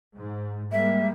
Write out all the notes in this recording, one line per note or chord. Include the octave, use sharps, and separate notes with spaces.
G#2
G3 G#3 A#3 E5